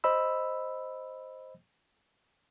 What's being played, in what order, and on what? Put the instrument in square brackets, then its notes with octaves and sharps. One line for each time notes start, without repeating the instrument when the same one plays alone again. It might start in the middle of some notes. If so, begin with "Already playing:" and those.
[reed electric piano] C5 D#5 B5 E6